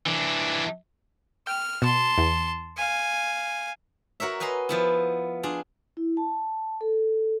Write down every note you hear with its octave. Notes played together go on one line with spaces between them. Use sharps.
E3 D4
G5 F6
B2 A5 C6
E2
F5 G#5
F#4 A#4 C#5 E5
B4 D#5 G#5 A#5 C6
F3 B3 E4
D4 F4 G#4
E4
A5
A4